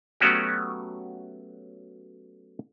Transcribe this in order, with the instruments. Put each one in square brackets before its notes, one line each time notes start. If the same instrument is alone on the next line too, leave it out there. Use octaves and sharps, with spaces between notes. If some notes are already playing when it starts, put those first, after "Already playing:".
[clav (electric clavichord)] F#3 A3 B3 C#4 F#4 G4